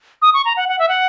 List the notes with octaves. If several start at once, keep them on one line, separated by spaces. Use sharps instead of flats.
D#6
C#6
A#5
F#5
F#5
E5
F#5